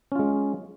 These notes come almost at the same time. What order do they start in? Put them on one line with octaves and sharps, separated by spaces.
C#4 F4 G#3